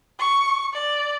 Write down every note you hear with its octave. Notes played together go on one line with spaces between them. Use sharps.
C#6
D5